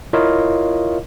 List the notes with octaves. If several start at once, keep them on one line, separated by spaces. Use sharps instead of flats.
E4 F4 A#4 C#5 D#5 F5